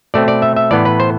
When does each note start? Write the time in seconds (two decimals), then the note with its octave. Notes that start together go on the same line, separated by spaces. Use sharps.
0.14 B2 A3 C4 D5
0.28 D5
0.42 E5
0.56 E5
0.71 A2 E3 B3 D5
0.85 B4
1.00 C5